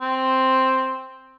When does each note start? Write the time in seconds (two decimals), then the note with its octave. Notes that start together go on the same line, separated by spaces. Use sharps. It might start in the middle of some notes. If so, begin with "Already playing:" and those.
0.01 C4